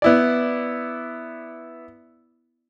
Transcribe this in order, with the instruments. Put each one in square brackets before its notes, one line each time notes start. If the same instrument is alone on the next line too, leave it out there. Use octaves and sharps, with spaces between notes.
[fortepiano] B3 E4 D5